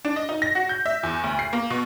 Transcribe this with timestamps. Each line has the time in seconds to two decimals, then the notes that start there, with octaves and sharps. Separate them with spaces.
0.05 D4
0.16 D#5
0.29 D#4
0.42 A#6
0.55 F#4
0.69 G6
0.86 E5
1.03 E2
1.24 D2
1.39 C7
1.53 A#3
1.70 B2